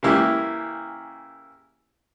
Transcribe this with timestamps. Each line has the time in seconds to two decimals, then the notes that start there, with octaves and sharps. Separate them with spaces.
0.03 C#3 E3 A#3 E4 G4